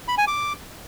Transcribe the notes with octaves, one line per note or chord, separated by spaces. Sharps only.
B5
G#5
D6